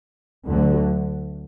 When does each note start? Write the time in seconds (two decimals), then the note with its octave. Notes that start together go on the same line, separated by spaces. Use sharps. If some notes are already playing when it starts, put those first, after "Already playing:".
0.47 D2 D3 F#3